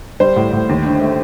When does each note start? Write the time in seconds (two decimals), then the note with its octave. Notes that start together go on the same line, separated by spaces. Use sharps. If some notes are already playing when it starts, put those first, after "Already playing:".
0.20 G3 C5
0.36 A2
0.53 A2
0.69 D#2
0.85 D3
1.01 A3